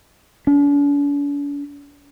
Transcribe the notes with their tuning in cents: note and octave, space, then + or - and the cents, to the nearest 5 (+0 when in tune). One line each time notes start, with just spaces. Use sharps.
D4 -45